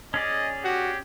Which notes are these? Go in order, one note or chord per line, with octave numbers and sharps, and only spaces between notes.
C#4 G#4 D5 D#5
F#4 G4